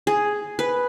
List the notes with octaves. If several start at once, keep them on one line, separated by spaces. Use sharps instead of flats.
G#4
B4